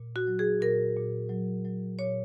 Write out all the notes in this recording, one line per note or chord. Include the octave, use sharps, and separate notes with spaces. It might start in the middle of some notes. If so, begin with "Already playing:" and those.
Already playing: A#2
F#4
F#3
G#4
A#2 A#4
A#2
F#3
F#3
A#2 C#5